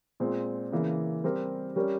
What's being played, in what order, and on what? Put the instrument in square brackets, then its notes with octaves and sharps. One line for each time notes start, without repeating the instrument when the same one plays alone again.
[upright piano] A#2 G#3 C4
C#3 E3 A#3
G3 C4 G4 A#4
G3 C#4 G4 A#4